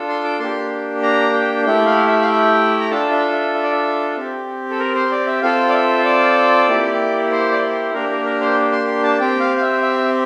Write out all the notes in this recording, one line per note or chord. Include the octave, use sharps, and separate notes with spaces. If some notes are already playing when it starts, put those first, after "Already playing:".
Already playing: D4 F4 A4
C6
D6
A#3 D4 G4 C6
A#5
G5
A3 E4 G4 G5
F5
E5
F5
G5
A#5
D4 F4 A4 A5
E5
E5
E5
D5
E5
C4 G4
A4
A#4
C5
D5
E5
C4 F4 A4 F5
D5
E5
D5
A#3 E4 G4
C5
D5
C5
A#3 D4 G4 A#4
A#4
A#4
C5
C6
C6
A5
C4 G4 G5
F5
F5
E5
E5